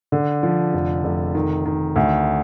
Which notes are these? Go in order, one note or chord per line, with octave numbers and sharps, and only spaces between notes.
D3
F3
F1
F1
D#3
D#3
D2